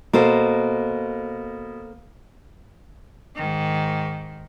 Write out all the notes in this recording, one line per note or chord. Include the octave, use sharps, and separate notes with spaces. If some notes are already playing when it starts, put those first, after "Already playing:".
B2 A#3 A4 C5
G#2 D#3